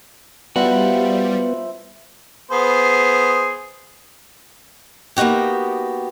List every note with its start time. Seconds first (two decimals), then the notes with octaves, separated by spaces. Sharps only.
0.56 F3 G3 B3 E4 F#4 C5
2.51 B3 G#4 C5
5.17 A#3 B3 D#4 F#4 G4